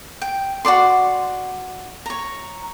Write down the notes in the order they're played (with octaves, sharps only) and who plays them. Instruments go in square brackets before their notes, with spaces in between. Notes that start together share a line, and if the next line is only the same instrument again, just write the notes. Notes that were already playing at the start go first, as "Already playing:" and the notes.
[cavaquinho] G5
F#4 A4 D5 C6
C#5 A#5